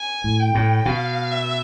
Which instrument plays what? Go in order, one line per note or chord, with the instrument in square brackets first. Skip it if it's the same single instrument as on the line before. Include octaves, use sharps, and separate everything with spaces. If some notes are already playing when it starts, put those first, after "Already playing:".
Already playing: [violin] G#5
[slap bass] A2
[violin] G5
[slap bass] A2
[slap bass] B2 [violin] F5
[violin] E5